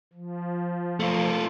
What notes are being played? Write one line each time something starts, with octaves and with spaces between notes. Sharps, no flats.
F3
A3 F4